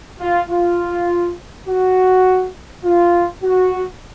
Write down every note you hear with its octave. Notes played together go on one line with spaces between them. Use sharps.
F4
F4
F#4
F4
F#4